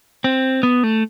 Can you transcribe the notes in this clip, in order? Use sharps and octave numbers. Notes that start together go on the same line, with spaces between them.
C4
B3
A3